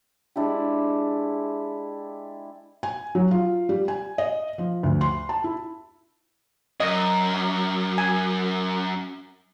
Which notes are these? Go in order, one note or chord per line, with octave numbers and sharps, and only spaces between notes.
G#3 D4 E4 G4
G#5
F#3
F4
G3
G#5
D#5
F3
D2
C6
A5
E4
F#2 D#5
G#5